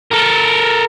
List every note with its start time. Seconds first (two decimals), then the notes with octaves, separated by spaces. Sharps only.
0.11 A4 A#4